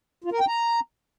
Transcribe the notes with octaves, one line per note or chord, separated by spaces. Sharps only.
F4
A#4
G5
A#5